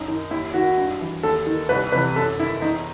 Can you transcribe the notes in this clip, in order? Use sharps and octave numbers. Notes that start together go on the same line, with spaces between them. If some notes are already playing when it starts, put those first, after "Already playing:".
Already playing: F#2 D#4
D#3
D#2 E4
D#3 F#4
G2
E3
D#2 A4
D#3
C2 B4
C3 E3 B4
F#2 A4
D#3 E4
E2 D#4